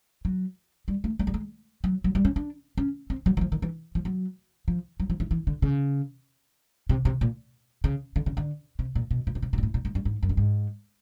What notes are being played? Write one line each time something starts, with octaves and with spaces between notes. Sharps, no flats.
F#3
G3
A3
G#3
G3
G#3
F#3
F#3
G3
C#4
D4
C#4
C4
F#3
E3
F3
D#3
E3
F3
F#3
F3
F#3
F3
E3
E3
D3
C#3
C3
C3
A#2
C#3
D3
C#3
D3
C3
A#2
B2
A#2
B2
C3
B2
A#2
A2
A#2
G#2
G2
G#2
F#2
G2
G#2